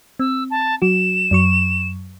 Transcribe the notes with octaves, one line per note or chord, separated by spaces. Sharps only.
C4 E6
A5
F#3 F#4 E7
F#2 F#3 C#6